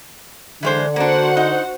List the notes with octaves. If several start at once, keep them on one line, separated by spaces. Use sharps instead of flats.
D3 E3 G#3 C5
A#3 D4 F#4 C5 F#5
D#4